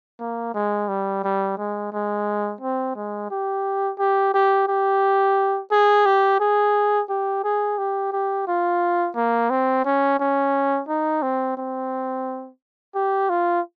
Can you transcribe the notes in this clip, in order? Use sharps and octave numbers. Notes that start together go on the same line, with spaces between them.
A#3
G#3
G3
G3
G#3
G#3
C4
G#3
G4
G4
G4
G4
G#4
G4
G#4
G4
G#4
G4
G4
F4
A#3
C4
C#4
C#4
D#4
C4
C4
G4
F4